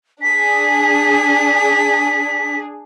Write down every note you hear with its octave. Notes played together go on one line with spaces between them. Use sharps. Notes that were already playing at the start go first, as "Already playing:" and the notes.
D4 G#4 B6